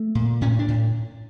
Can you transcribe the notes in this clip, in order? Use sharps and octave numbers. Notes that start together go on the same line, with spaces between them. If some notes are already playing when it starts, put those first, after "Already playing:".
Already playing: A3
A#2
A2 C#4
D4
A2